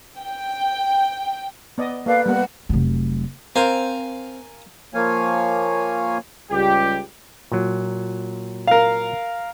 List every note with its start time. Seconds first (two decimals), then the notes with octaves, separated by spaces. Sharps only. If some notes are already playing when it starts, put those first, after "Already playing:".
0.17 G5
1.78 B3 D5 D#5
2.06 A#3 A4 B4 D5 F5
2.26 G3 A#3 B3 F#5
2.69 F1 F#3
3.56 C4 A#4 C5 F5 G#5
4.94 F3 A#3 C#5 F5 G#5
6.50 C#2 G3 G4
7.52 A#2 F#3
8.67 A#4 F5